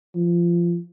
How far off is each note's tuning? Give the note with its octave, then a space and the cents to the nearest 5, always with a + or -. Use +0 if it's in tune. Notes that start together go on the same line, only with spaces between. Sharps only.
F3 -20